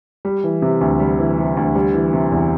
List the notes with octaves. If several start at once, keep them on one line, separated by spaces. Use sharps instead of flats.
G3
E3
C3
D2
G3
E3
C3
D2
G3
E3
C3
E2